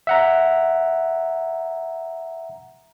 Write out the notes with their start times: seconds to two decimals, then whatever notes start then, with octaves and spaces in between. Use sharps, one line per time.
0.07 E5 F#5 A#5